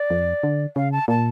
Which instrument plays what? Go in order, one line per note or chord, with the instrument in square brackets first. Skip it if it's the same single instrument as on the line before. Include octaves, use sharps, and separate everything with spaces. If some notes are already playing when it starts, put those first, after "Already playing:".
Already playing: [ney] D5
[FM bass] F2
D3
[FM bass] C#3 [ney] F5
[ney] A5
[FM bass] A#2 [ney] A5